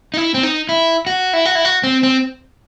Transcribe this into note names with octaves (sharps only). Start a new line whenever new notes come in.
D#4
E4
C4
D#4
E4
F#4
E4
F#4
E4
F#4
C4
C4